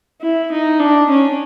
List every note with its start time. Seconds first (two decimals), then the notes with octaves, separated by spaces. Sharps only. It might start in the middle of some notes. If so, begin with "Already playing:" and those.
0.22 E4
0.51 D#4
0.80 D4
1.10 C#4